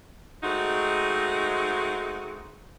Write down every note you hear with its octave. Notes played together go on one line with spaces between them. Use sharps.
G#3 A3 C4 D#4 F#4